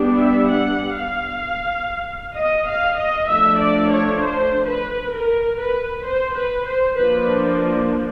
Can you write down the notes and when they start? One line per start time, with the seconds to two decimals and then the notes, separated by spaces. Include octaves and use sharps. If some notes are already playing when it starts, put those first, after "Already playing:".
Already playing: G3 B3 D4
0.20 E5
0.51 F#5
0.97 F5
2.35 D#5
2.66 F5
2.97 D#5
3.28 F3 A3 D4 E5
3.59 D5
3.90 C#5
4.20 C5
4.67 B4
5.13 A#4
5.59 B4
6.05 C5
6.37 B4
6.67 C5
6.98 F3 A#3 D4 B4